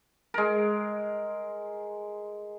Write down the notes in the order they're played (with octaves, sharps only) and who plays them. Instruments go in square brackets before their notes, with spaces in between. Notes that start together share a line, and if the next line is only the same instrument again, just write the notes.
[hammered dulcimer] G#3 A#4